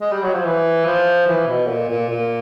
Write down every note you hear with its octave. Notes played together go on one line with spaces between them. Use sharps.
G#3
G3
F#3
F3
E3
F3
E3
B2
A#2
A#2
A#2